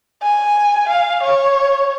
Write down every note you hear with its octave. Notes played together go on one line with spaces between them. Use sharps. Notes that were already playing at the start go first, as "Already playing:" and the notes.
G#5
F5
C#5